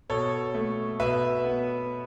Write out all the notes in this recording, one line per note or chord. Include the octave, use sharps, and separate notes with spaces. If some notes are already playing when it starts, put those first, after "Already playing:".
B2 A4 C#5
A3
B2 B4 E5
B3